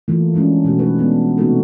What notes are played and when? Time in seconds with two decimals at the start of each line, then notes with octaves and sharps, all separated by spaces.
0.08 E3 A3 A#3 E4 F4
0.33 F3 F#3 G#3 C#4 D4
0.64 B2 A3 A#3 F#4
0.79 F#3 A3 D#4 B4
0.98 G#3 B3 D4
1.38 C3 A3 B3 D#4 F#4 A4